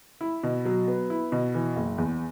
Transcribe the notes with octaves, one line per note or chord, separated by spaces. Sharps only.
E4
B2
F#3
B3
E4
B2
E3
F#1
E2